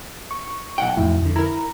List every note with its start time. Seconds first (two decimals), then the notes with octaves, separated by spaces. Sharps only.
0.31 C#6
0.78 B1 F#5 G5
0.97 F2 A2 E4
1.22 F2 D3
1.36 E4 A#4 A#5